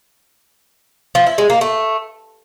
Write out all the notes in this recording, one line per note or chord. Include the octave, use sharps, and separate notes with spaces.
F3
E4
G#3
A#3
A3